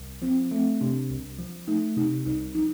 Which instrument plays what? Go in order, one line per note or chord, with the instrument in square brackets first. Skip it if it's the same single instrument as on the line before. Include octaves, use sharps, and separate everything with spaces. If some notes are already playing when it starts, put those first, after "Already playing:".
Already playing: [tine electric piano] C2
[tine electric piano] F3 [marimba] C4
[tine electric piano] A3 [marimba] C4
[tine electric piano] C3 [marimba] D4
[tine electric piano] C2
F3
[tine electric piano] A3 [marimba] D#4
[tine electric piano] C3 [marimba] D#4
[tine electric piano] C2 [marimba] D#4
[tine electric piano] F3 [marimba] D#4